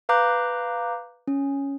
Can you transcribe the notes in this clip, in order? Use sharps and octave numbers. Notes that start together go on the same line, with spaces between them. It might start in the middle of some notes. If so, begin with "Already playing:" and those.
B4 F5 A#5 D6 F#6 G6
C#4